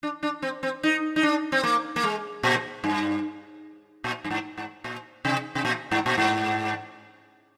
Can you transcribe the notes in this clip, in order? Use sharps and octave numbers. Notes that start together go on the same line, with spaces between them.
D4
D4
C4
C4
D#4
D#4
D4
C4
A#3
A#3
G#3
A#2
G2
A#2
G2
G#2
G#2
A#2
C3
C3
A#2
G#2
A#2
G#2